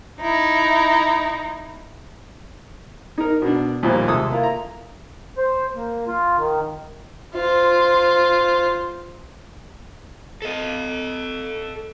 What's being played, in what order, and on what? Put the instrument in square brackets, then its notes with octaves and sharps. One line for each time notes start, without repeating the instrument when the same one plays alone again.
[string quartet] D#4 E4
[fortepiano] D#4 A#4
B2 D4
D#2 A#2 F3 G3
C3 G#3 A4 D#6
A#3 E4 F4
A#5
[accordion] C5
A#3
F4
D#3
[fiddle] F4 C5
[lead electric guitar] A4 D#5